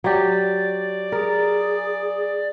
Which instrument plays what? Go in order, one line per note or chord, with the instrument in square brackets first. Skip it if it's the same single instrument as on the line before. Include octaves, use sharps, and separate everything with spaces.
[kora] F#3 G4 [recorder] D5
[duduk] G#4 [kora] A#4